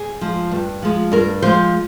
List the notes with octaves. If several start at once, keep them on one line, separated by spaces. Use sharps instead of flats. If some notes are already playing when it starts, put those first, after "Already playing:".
Already playing: G#4
F3 G#3
G2
F3 G#3
G2 A#4
F3 G#3 C5